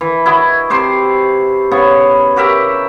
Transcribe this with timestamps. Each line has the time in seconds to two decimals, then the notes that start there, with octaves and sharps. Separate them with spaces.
0.01 E3
0.26 E4 F#4 D#5
0.70 C3 C5 C6 D6
1.71 C#3 B3 C#6
2.36 F#4 G4 A#4 E5